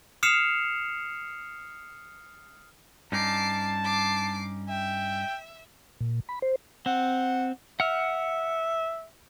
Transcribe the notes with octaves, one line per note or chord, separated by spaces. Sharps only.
D#6 F6 C7 C#7 E7 F7
G2 C#4 D#4 A5 D6 C7
D6 C7
E5 G5
A#2
B5
C5
C4 F#5
E5 F#5 F6